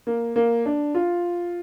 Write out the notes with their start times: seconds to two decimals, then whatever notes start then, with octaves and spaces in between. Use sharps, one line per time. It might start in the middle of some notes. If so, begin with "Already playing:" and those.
0.07 A#3
0.36 A#3
0.66 D4
0.95 F4